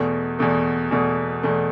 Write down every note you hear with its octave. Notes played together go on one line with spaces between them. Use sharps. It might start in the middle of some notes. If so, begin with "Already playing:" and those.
Already playing: E2 B2 A3
E2 B2 A3
E2 B2 A3
E2 B2 A3